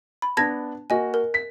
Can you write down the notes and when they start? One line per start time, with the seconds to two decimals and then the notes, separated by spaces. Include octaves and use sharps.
0.22 B5
0.37 B3 D4 A5 G#6 A#6
0.90 A#3 F#4 D#5 G#5
1.14 A#4
1.34 B6